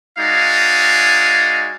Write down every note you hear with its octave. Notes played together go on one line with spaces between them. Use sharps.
G#3 D#4 F#4 D5 F5 G#5